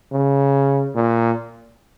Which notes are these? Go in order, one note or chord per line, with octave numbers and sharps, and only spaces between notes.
C#3
A#2